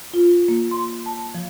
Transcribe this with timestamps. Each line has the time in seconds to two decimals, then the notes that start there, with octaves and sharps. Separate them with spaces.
0.14 F4
0.48 A#3
0.71 C6
1.06 A5
1.34 F3